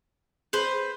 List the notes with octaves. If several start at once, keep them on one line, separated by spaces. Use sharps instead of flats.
G#4 B4 C5